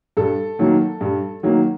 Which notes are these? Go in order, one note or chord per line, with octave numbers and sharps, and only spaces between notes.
G2 A4
D#3 F#3 A#3
G2
D#3 F#3 A#3